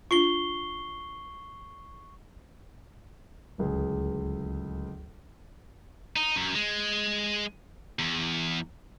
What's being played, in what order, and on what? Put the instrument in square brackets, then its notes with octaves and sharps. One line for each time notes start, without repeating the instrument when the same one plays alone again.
[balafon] D4 F4 [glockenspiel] C#6 C7 G7
[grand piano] D1 C#2 G#4
[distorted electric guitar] D#4
F#2
G#3
E2